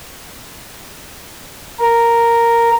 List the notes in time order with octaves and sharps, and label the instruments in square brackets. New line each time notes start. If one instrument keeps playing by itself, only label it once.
[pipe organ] A#4